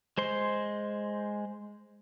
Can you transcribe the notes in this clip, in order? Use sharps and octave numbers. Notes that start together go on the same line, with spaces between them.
G#3 C5 C6